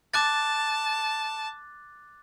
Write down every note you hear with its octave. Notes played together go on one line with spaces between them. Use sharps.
A5 D6 F#6 A6